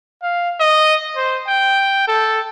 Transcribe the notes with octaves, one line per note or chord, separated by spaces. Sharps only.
F5
D#5
C5
G5
A4